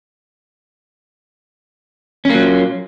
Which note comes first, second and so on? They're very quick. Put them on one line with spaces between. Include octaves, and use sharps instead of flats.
C#4 A#3 F#3 A#2